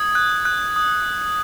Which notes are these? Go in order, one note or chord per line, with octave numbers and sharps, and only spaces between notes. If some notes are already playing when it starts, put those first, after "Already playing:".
Already playing: D#6 G#6
F#6
F#6
D#6